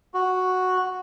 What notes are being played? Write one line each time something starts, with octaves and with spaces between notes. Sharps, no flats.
F#4